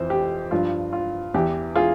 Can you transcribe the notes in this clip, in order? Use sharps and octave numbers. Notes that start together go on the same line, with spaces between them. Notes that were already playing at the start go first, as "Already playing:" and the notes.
Already playing: F2 E3 C5
G4
G2 F3 F4
F4
E2 E3 G4
F4 G#4